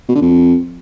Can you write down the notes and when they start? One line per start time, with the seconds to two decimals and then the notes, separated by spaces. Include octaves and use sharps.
0.09 B2
0.15 D3
0.22 F2